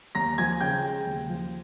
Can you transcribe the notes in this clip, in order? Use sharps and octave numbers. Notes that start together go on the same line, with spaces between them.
D#2 A#5 A#6
F3 G#5 G#6
C#3 G5 G6
G#3
D#2
F3